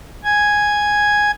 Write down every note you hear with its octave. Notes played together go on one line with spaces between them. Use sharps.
G#5 G#6